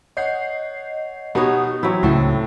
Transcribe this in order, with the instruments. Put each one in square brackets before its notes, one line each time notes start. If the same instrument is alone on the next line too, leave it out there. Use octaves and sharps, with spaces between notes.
[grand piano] C#5 F#5 [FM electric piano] D#5 G6 C7
[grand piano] B2 F#4 [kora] B3 D#4 C#5 [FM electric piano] G4
[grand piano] E3 [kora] F#3 C4 E4
[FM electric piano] C#2 C#3 E4 [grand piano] A2 [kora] F#4 A4